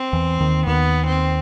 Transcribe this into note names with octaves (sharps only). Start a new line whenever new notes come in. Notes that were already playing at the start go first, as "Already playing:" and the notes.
Already playing: C4
E2 E3
D#2 D#3
D#2 D#3 B3
C4